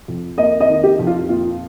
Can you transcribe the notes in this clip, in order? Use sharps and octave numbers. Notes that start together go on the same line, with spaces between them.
F2
A#3 D#5
D#5
D#3
G4
F2
F4
A#2 F4